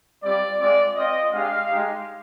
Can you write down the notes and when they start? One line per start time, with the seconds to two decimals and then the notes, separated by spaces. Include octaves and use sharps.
0.23 G3 C4 F4 D5
0.59 G#3 C4 F4 D5
0.96 C4 F4 D#5
1.33 G#3 D4 G4 F5
1.69 G#3 D#4 G4